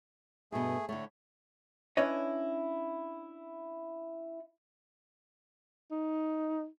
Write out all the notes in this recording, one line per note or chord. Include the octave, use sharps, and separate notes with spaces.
G2 B2 A3 G#4
A2 D3 A3 C#5
C#4 D4 E4 B4 C#5 D#5
D#4